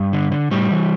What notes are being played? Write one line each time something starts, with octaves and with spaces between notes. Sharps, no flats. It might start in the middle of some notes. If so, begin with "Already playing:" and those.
Already playing: G2
D3
D3
A2 G3
E3